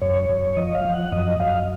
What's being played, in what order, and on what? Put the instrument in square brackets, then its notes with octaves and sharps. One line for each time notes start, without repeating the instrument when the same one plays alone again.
[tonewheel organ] F#2 C#5
F#2
F3 D#5
F5
F3
F#5
F#2 D#5
F#2 F5